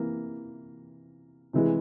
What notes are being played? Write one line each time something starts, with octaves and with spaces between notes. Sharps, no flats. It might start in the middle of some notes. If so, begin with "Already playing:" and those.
Already playing: C3 E3 A#3
C3 E3 G#3